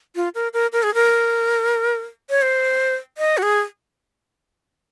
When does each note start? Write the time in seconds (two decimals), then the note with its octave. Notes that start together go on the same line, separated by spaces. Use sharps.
0.16 F4
0.35 A#4
0.54 A#4
0.73 A#4
0.83 G#4
0.94 A#4
2.30 C#5
2.42 C5
3.18 D#5
3.38 F#4
3.43 G#4